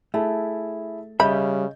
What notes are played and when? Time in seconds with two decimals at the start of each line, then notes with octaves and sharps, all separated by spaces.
0.14 A3 E4 G#4 A5
1.20 C#3 G3 D#5 E5 B5 G6